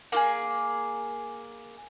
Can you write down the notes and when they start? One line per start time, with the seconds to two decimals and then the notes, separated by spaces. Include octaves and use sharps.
0.12 A#3 F4 G#4